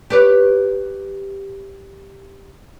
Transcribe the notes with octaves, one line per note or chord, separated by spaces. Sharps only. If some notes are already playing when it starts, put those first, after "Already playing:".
G4 B4 C#5